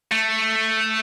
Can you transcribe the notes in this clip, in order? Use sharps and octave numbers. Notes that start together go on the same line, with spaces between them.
A3